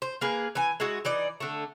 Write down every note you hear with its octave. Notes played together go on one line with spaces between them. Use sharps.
C5
A#3 G#4 B4
E3 G#5
G#3 D#4 E4 F#4
E3 D#4 D5
D3 A3